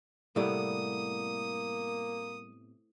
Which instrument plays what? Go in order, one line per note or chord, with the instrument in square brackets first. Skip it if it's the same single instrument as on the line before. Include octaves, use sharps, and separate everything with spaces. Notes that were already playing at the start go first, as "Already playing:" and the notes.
[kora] A2 C3 B3 [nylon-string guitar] G3 A4 D5 [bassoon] A#3 [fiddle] D#6